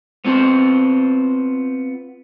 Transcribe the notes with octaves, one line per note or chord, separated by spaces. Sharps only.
B3 C4 F4 C5